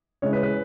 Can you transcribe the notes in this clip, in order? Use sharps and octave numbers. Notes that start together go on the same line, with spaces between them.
C#3 G#3 E4 C#5
B4
B4